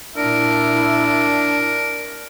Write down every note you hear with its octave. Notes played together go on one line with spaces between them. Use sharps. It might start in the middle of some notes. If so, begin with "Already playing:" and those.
A#2 D4 E4 A#4